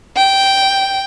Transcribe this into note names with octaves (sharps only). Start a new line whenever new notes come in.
G5